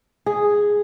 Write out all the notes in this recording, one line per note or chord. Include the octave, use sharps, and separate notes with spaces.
G#4